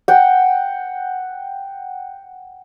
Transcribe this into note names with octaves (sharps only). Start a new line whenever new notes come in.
F#5 G5